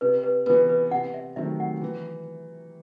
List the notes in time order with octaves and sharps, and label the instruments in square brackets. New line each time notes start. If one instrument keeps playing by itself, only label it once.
[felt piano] C3 [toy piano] B4
[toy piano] B4
[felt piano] B3 [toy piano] B4
[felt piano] E3
[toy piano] B4
[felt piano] C3 [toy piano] F#5
[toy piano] E5
[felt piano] D#3 F#3 A3 C4 [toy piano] E5
[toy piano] F#5
[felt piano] E3